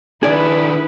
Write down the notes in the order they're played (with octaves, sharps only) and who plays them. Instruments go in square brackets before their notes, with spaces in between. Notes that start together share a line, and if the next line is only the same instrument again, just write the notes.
[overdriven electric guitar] D#3 D4 [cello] E4 B4 [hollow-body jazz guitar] G#4 D5